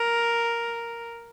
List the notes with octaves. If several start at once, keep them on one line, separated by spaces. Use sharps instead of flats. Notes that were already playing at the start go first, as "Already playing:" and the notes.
Already playing: A#4